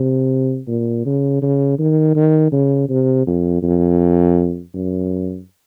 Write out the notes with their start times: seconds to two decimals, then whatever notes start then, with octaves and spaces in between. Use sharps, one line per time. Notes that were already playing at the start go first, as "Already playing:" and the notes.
Already playing: C3
0.68 A#2
1.06 C#3
1.42 C#3
1.79 D#3
2.15 D#3
2.52 C#3
2.89 C3
3.27 F2
3.63 F2
4.74 F#2